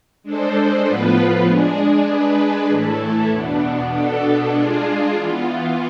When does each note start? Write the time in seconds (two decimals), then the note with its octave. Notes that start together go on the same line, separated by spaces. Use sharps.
0.23 G#3 D4 A4 C5
0.84 A2 F3 B3 F4 B4
1.45 G#3 D4 G#4
2.07 G#3 D4 G#4 B4
2.68 A2 E3 A3 E4 A4
3.29 E2 B2 B3 D4
3.90 B2 B3 D4 A4
4.52 G#3 D4 F4 G#4
5.13 E3 B3 F4